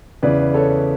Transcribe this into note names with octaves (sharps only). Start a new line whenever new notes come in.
E2 C#3 E3 B4 D5
A4 C#5